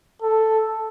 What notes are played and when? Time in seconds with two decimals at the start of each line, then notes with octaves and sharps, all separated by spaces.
0.22 A4